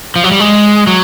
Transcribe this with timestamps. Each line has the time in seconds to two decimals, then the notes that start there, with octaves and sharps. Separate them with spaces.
0.16 F3
0.24 F#3
0.32 G3
0.40 G#3
0.87 F#3